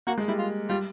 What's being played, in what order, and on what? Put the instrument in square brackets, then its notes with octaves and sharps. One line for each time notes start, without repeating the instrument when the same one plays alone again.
[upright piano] A#3 [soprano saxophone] F#4
[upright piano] G#3
[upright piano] G3 [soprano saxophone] E4
[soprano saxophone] F4
[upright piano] G3 [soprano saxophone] F4